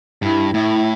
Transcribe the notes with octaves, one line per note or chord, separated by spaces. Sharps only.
G2 E4
A2 E4